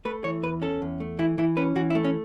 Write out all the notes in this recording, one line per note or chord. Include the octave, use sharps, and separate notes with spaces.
A3 B4
E3 C#5
E2 B4
C#4 A4
E2
A3
E3 E4
E3 E4
C#4 B4
E3 F#4
E4
A3
C#4